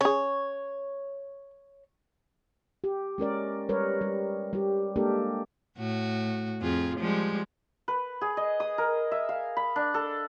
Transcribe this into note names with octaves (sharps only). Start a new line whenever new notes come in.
C#4 G#4 C#5
G4
G#3 C#4 A#4 D5
G3 A#4 B4 C#5
G3
G3 G4
G#3 A#3 D4 G4 A4 A#4
A2 F#4
F2 F4 G#4
F3 G3 G#3
B4
G#4
D#5
D#6
A#4
E5
F5
B5
D4
A4